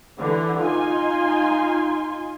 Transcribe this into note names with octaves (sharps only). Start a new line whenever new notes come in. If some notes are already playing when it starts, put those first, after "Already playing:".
D3 E3
D#4 F4 G#5 C6